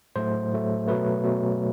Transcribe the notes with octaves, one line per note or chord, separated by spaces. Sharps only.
A2 F#3 A3 C5
A2 F#3 A3
B2 F#3 A3 B4
B2 F#3 A3